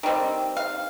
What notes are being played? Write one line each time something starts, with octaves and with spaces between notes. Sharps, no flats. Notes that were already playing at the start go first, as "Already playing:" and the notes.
D#3 G3 C4
F5